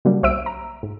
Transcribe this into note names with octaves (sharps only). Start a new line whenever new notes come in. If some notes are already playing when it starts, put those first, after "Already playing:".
C#3 F#3 G3 A#3 D4
B1 C5 E5 E6 D7
A#5
G#2